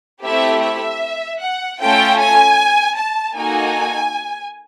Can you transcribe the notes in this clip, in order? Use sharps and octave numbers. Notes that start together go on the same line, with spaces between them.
A3 C4 E4 G4 E5
E5
F#5
A3 C#4 F4 A4 G5
G#5
A5
A#3 D#4 F#4 A4 G#5